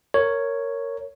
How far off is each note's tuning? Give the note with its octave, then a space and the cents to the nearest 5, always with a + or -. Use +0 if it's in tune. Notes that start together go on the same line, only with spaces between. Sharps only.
A#4 -15 C#5 +0